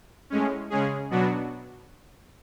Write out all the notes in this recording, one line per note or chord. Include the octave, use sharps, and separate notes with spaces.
A2 G#3 C#4
C#3 G#3 C#4 G#4
B2 F#3 B3 D4 F#4